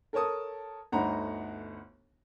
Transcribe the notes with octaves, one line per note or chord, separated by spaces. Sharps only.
A4 A#4 C#5 A5 D#6
G1 D2 D#4 F#5 A#5 B5